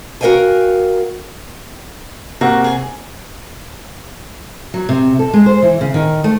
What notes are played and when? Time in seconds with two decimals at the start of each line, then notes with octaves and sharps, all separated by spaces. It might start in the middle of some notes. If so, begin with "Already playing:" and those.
0.21 F#4 A#4 D5 F5 G5 G#5
2.41 C3 A#3 F#4
2.64 G#4 G#5
4.74 F#3
4.89 C3
5.19 A4
5.33 G#3
5.46 C5
5.63 E3
5.81 C#3
5.94 D#3
6.24 A3